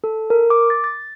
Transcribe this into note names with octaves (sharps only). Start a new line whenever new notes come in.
A4
A#4
D6
A6
A6